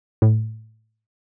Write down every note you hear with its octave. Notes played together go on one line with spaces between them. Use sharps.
A2